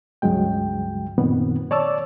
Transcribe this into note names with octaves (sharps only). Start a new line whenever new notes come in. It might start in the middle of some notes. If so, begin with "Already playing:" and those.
C#2 G2 C#3 F#3 G#3 G5
F#2 A#2 D#3 B3 C4
C#5 D5 A5 D6 E6